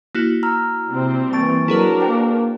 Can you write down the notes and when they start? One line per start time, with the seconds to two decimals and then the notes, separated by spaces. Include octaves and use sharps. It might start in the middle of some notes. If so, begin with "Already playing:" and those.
0.15 A#3 E4 F#4 F#6
0.43 A#5 E6 F6
0.89 C3 G3 C4
1.33 E3 A#3 A5 C#6 A6 D7
1.68 F#3 D4 E4 F#4 G#4 A#4 B4
2.00 A#3 C5 G5